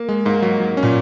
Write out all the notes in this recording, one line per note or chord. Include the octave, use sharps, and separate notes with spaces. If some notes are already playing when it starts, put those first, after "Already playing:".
Already playing: A#3
G#3
G#2 A#3
F#3
F#3
C#4
A#2